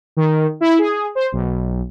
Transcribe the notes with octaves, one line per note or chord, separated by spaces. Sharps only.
D#3
E4
G#4
C5
B1